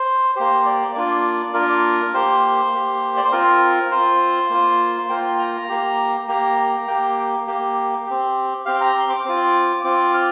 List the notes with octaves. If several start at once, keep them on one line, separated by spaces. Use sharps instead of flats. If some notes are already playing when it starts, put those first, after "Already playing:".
Already playing: C5
A#3 G4 C5
D5
A#3 D4 F4
A#3 D4 F4 A#4
A#3 G4 C5
A#3 G4
D5
C5
C4 F4 A#4
C4 F4 C5
A#3 F4
A#3 F4 G5
A#5
A#3 G4
A#3 G4 A#5
A#5
A#3 G4 G5
A#3 G4
C4 G4
C4 G4 F5
G5
A#5
C6
D6
C4 F4
C4 F4 D6
F6